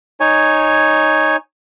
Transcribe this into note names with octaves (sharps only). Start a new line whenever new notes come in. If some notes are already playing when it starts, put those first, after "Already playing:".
D#4 C#5 G#5